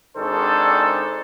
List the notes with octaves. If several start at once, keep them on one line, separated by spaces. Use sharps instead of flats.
G#1 D#3 D4 G#4 A4 C5